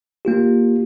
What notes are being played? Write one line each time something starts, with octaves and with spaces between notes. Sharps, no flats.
A#3 F4 G4